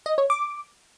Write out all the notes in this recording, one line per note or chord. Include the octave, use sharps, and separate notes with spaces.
D#5
C#5
D6